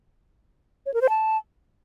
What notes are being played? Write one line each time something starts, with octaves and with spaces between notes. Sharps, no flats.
C#5
A#4
C5
A5